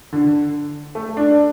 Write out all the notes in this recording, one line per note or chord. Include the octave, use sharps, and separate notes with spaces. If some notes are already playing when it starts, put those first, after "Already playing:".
D3
A3
D4